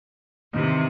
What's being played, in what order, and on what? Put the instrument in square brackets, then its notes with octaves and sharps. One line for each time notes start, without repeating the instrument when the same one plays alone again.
[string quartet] C3 [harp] D#3 E3